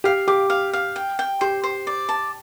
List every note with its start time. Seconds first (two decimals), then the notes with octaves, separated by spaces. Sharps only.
0.04 G4 F5
0.28 G4 D6
0.50 F5
0.73 F5
0.96 G5
1.19 G5
1.41 G4 C5
1.63 C5
1.87 D5
2.09 A5